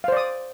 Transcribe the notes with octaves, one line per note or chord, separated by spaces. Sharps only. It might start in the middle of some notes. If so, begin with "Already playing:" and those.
C5 D5 F5 D#6